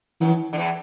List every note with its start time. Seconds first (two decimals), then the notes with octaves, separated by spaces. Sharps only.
0.21 F#2 E3 F#3
0.53 D3
0.57 E2 E3